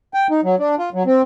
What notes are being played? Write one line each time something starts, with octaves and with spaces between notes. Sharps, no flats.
G5
D#4
F#3
D4
F4
F#3
C4